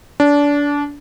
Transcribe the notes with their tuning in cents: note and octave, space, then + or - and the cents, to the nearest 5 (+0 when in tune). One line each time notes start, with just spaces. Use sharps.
D4 -25